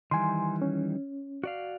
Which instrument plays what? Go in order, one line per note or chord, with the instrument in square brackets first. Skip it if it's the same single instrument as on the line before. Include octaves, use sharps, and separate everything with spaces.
[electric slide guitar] D#3 E3 G3 [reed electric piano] G#5 C6
[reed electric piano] C#4
[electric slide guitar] F#4 D5 F5